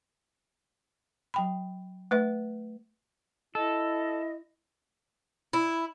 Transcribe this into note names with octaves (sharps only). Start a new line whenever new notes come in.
F#3 G5 B5
A3 B4 E5
E4 A4 D#5
E4